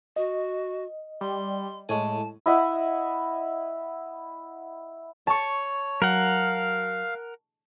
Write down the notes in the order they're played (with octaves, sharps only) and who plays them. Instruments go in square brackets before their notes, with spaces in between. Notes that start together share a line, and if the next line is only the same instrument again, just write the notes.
[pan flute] F#4 [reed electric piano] D#5
[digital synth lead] G3 [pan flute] C6
[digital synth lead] A2 [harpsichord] G#3 C#5 G#5 [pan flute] A5
[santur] E4 D#5 E5 F#5
[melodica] C#5 [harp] A5 C#6
[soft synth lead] F#3 [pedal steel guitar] A#4 F#5 [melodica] F5